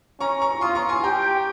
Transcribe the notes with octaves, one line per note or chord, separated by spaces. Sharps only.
C#4 A#5 C#6
A#5 C#6
F4 C6 D#6
A#5 C#6
G#5 C6
G4 G5 A#5